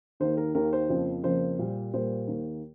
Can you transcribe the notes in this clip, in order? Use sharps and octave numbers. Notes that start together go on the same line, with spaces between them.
D#2 D#3 A#3 C5
A#4
D#2 D#3 A#3 A#4
C5
F2 C#3 F3 A#3
F2 C#3 F3 A#3 C5
A#2 G3 A#3
A#2 G3 A#3 C5
D#2 D#3 A#3